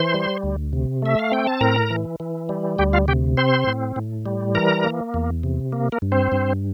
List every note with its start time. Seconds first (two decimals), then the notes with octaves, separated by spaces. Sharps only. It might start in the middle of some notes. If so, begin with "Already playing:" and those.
Already playing: E3 C5 C6
0.14 G3
0.43 D2
0.73 C3
1.02 A3 E5
1.19 F5
1.32 C4 G5
1.47 A5
1.61 A2 A#4 A#5
1.90 E3
2.20 E3
2.49 G3
2.79 D2 G4 G5
2.93 F4 F5
3.08 C3 G4 G5
3.37 C4 C5 C6
3.67 A2
3.96 A2
4.26 G3
4.55 E3 A#4 A#5
4.84 A#3
5.14 E2
5.43 C3
5.73 A#3
5.92 A#3 A#4
6.02 G2
6.12 C4 C5
6.32 G2